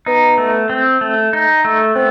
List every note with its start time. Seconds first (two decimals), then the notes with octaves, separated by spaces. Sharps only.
0.06 B3 D#4
0.38 A3
0.69 C4
1.01 A3
1.33 D#4
1.65 A3
1.96 B3 C4